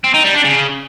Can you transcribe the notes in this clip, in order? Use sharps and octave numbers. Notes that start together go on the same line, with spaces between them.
C4
D#4
G3
D4
C#3